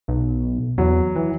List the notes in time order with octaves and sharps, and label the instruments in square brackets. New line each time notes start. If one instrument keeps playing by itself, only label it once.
[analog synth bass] B1
[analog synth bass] E2 [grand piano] F#3
[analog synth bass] E3